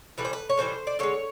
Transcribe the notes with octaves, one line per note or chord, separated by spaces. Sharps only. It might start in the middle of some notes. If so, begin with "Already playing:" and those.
A2 E3 G3 B4
C5
B4
C#5
A2 E3 G3 C5
D5
D3 F3 G#3 C#5